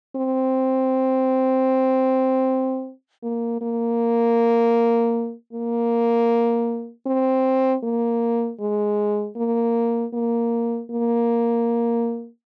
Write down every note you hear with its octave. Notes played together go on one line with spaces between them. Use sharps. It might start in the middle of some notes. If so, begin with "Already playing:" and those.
C4
A#3
A#3
A#3
C4
A#3
G#3
A#3
A#3
A#3